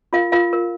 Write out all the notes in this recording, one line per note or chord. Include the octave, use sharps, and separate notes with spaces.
F4 A#4 F5
F4 A#4 F5
A#4